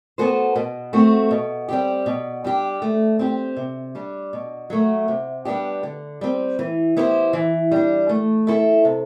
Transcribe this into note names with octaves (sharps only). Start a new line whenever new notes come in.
B3 F#4 A4 C5
B2
A3 C4 F#4
B2
G3 C4 G4
B2
G3 D4 G4
A3
C4 E4 G4 C5
C3
G3 D4
B2
F#3 A3
C3
G3 B3 D4 G4
D3
G3 C4
E3
B3 E4 G4 C5
E3
G3 D4
A3
E4 A4 C5 E5
C3